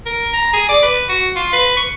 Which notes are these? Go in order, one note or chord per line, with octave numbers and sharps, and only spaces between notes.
A#4
A#5
G#4
D5
B4
F#4
F4
B4
C#6